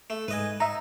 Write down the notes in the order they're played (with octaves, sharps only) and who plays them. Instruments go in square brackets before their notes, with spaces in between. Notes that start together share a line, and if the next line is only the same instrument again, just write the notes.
[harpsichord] A3
[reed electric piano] G#2 [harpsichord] B4 D#5 G#5
[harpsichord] D#4 [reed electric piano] E5 A#5